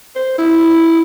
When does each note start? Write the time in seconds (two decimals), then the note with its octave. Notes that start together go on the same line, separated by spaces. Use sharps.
0.16 C5
0.38 E4